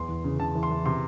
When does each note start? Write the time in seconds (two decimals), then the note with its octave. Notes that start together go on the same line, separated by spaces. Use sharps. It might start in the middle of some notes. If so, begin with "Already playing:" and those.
Already playing: E2 C6
0.09 E3
0.24 C#3
0.39 C#3 A5
0.55 E3
0.63 C6
0.70 E3
0.85 C3 C6